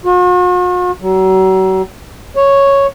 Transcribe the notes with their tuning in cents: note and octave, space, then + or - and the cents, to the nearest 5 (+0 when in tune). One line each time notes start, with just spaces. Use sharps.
F#4 -45
F#3 +35
C#5 +0